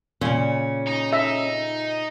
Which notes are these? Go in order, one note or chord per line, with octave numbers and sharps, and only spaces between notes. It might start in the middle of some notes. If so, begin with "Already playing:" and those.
A#2 C#3 C#4
D#4
D#4 E5